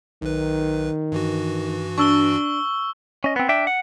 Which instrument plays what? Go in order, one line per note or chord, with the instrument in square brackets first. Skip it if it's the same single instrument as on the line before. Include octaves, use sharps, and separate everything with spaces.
[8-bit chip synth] B1 B4 [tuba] D#3
[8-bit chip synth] G2 E3 F#4
[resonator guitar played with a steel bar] D4 D5 [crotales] C#6 E6 G7
[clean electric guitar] C#4 D#5
B3 C4
D4 E5 G5
F#5